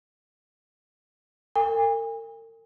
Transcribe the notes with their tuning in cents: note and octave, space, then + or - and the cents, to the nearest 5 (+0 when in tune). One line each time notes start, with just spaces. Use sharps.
A#4 -45 G#5 -40